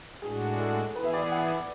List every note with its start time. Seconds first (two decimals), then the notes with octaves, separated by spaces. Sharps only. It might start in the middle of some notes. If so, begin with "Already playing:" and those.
0.22 A2 G#3 D4 F#4 G#4
0.59 A4
0.94 E3 B3 E4 G#4 B4
1.04 E5
1.13 D5
1.31 F#5